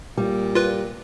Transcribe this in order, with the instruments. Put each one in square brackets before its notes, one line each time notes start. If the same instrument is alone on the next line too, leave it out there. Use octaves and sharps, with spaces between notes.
[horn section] A#2 [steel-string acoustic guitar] G3
[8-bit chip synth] F4 B4